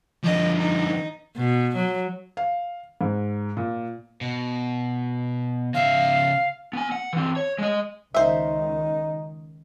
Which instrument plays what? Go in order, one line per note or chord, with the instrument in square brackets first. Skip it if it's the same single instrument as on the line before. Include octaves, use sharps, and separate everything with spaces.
[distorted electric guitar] D3 F3 [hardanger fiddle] D#5
[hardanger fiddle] D#4
[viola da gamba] B2
F#3
[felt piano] F5
G#2
A#2
[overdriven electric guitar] B2
[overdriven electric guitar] C#3 E5 [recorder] F5
[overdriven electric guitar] B3 G#5
F#5
E3 C4
C#5
G#3 D#5
[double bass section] C#2 D#3 [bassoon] D#4 [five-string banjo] C5 E5